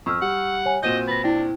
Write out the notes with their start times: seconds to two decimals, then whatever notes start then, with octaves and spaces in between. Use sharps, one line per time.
0.06 F2 C#6 E6 F6
0.22 G3 F#5
0.66 C#5 G#5
0.83 A#2 C4 F#4 D#5 G6 D#7 E7
1.08 B4 A6 A#6
1.24 D4 E4 G5